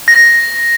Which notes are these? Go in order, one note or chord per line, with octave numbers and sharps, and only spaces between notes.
A#6